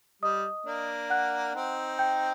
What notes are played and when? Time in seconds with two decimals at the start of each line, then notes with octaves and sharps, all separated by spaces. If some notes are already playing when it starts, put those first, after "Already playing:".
0.22 G3 D#5 D#6
0.66 A#3 D4
1.10 F#5 F#6
1.55 C4 D#4
1.99 G5 G6